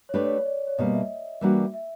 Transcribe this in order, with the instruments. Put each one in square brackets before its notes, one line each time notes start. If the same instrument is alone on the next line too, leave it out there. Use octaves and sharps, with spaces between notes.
[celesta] C#5
[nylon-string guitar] A3 D4 G4 B4 [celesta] D5
[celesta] C#5
C#5
D5
C#5
[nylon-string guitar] B2 G3 A#3 [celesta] D#5
[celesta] E5
[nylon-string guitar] E3 G3 A#3 D4 F#4
[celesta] E5